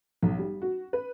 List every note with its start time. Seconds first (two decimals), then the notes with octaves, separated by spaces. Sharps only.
0.23 B1
0.38 G3
0.62 F#4
0.93 B4